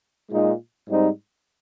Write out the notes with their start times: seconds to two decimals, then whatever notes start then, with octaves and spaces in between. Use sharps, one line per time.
0.31 A#2 G#3 D#4
0.89 G#2 G3 C4 D#4